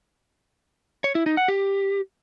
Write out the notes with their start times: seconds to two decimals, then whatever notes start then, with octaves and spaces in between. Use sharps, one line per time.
1.04 C#5
1.15 E4
1.26 D#4
1.37 F#5
1.48 G4